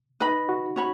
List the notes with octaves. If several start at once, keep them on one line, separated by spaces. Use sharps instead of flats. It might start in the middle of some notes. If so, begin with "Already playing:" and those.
D#4 B4 D#5 B5
F#4
C#4 F#4 C#5 B5